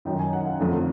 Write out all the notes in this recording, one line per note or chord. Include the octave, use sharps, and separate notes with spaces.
F#2 D#3 F#3 G5
G#5
F#5
F5
F2 D3 F3 A3